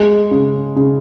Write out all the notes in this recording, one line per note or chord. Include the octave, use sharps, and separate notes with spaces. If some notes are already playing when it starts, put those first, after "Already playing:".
Already playing: G#3
C#3
C#3